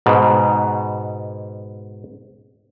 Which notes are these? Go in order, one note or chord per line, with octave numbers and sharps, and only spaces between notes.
G#2 B2